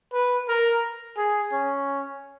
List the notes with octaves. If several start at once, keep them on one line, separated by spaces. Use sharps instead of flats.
B4
A#4
G#4
C#4